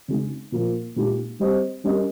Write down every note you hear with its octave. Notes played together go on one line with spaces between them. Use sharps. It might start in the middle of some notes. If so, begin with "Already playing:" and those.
C#3 G#3 D#4
A#2 F3 A#3
A#2 G#3 D#4 G4
G3 C4 G4 C5 D#5
G3 C#4 G4 A#4 D#5